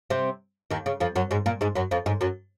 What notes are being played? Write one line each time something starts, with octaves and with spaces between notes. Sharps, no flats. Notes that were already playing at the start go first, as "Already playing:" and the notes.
C3 C4
D#2 D#3
C#3
F2 F3
F#2 F#3
G#2 G#3
A#2 A#3
G#2 G#3
F#2 F#3
F2 F3
G#2 G#3
F#2 F#3